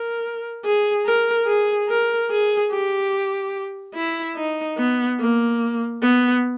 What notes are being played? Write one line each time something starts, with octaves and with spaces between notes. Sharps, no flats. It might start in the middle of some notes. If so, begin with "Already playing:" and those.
Already playing: A#4
G#4
A#4
G#4
A#4
G#4
G4
E4
D#4
B3
A#3
B3